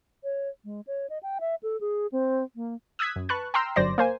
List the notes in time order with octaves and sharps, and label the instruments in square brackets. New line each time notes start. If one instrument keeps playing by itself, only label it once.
[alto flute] C#5
G#3
C#5
D#5
G5
E5
A4
G#4
C4
A#3
[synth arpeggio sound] D#6 E6 F#6 G#6 B6
F#2
B4 A5 C#6 F#6
G5 A#5 C6 E6 F6
G1 F#2 C5 D5 A#6
A#3 C5 G#5